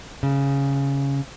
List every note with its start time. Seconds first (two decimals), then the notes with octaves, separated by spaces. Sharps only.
0.23 C#3